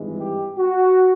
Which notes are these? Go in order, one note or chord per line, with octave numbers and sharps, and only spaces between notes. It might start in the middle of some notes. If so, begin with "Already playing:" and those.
Already playing: G#1 G2 E3 G#3
G4
F#4